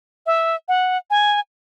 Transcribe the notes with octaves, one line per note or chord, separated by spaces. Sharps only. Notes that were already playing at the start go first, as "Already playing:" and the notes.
E5
F#5
G#5